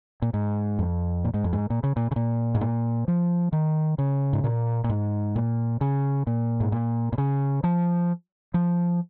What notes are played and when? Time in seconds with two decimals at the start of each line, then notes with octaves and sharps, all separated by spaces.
0.22 A#2
0.34 G#2
0.79 F2
1.24 A#2
1.34 G#2
1.44 F2
1.53 G#2
1.70 A#2
1.83 C#3
1.96 A#2
2.11 C#3
2.16 A#2
2.55 G#2
2.61 A#2
3.08 F3
3.53 D#3
3.98 C#3
4.33 G#2
4.44 A#2
4.84 A#2
4.89 G#2
5.36 A#2
5.81 C#3
6.27 A#2
6.60 G#2
6.72 A#2
7.13 A#2
7.18 C#3
7.64 F3
8.54 F3